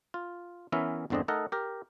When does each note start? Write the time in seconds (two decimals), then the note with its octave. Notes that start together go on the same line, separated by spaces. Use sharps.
0.14 F4
0.72 E3 B3 C#4 A#4 E5
1.10 G1 E2 D3 C4 D4 D#5
1.28 A3 D#4 A4 A#4 D#5 F#5
1.52 G4 A#4